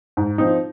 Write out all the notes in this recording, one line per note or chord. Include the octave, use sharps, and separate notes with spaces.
G#2
F3 C4 D#4